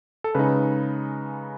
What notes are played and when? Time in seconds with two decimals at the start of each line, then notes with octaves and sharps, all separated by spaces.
0.24 A4
0.35 C#3 G#3 D#4 B4